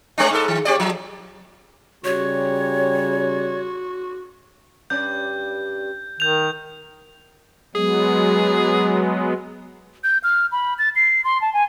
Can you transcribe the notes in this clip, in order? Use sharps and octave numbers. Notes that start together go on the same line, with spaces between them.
G#3 C4 D4
G#2 A4
D#3
C4 G4 D5
F3
C#3 G3 F#4 C#5
G2 C#4 D5 G6
D#3 G6 F7
F#3 G#3 B3 G#4
G6
F6
B5
A6
C7
C6
A5
G#5